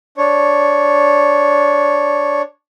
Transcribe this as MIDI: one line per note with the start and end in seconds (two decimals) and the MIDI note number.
0.18 2.42 62
0.18 2.42 73